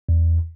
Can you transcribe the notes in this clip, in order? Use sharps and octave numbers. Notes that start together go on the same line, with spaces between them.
E2